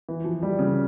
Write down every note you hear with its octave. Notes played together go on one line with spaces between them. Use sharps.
E3
F3
G3
C#3